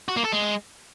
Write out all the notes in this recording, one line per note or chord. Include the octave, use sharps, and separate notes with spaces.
F#4
A#3
A4
G#3